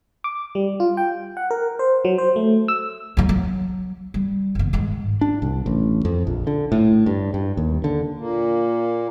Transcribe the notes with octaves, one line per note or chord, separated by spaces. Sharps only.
D6
G3
F4
G5
F#5
A#4
C5
F#3
C5
A3
E6
F#3 D#4
F#3
G3
F#1 E2
G#2 D#3
D4
C2
A1
F2
A#1
D3
A2
G2
G2
D#2
D3
A#2 A#3